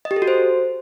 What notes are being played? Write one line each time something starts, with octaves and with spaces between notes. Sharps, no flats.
D#5
G4
A4
F#4
C5